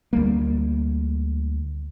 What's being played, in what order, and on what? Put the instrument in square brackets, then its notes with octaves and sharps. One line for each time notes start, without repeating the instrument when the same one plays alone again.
[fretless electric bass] D2 G3 A#3